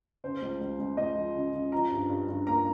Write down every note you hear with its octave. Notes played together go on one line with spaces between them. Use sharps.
C#3 C5
C#2
C#2
C#2
C#2 D#5
F3
C#3
C#3
F3 A#5
G2
G2
G2
A#3 A#5